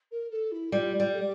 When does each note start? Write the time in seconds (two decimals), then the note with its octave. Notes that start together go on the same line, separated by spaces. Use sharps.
0.11 A#4
0.31 A4
0.52 E4
0.72 G3 F4
1.00 G3
1.13 A4
1.18 G4